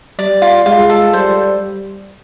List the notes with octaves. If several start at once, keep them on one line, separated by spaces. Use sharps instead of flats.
G3 D5
F4
G#3 F4
A4
G3 C5